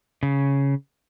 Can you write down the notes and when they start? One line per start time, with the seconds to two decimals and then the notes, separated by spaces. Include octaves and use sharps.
0.23 C#3